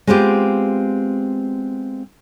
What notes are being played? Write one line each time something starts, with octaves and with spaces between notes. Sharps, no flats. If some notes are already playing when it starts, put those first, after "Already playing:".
G#3 B3 C4 F4 G4